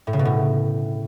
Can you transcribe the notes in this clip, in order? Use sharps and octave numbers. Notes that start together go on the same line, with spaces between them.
A2
C#3
B2
A2